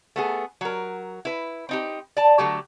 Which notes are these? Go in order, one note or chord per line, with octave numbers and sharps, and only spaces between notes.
A3 B3 G#4
F#3 A#4
E4 B4
C4 D#4 G4
D5 A5
D3 F#3 A3 G4